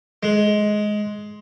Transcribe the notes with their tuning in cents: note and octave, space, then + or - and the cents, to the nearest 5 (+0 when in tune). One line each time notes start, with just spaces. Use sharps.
G#3 +15